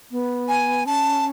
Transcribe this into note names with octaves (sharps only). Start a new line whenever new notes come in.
B3
G#5
C#4 A5